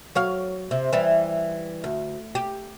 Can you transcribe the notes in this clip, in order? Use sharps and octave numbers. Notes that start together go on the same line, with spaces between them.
F#3 C#5 F5
C3
E3 G3
D2
G4